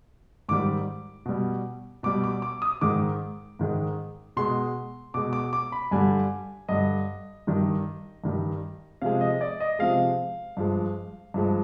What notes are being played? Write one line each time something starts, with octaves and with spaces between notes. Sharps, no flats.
G#2 D#3 G3 D6
B2 G3
B2 G3 D6
D6
D6
D#6
G#2 D#3 G#3 D6
G#2 D#3 G#3
B2 G#3 C6
B2 G#3 D6
D6
D6
B5
G2 D3 G3 G#5
G2 D3 G3 D#5
G2 D#3 G3
G2 D#3 G3
C3 F3 G#3 F5
D#5
D5
D#5
C3 F3 G#3 F5
G2 F3 G#3
G2 F3 G#3